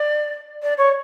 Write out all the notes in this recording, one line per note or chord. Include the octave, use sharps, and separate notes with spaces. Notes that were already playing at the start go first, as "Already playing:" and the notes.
Already playing: D5
D5
C#5